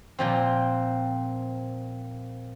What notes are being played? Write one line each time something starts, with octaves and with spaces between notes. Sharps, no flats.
A#2 F3 C4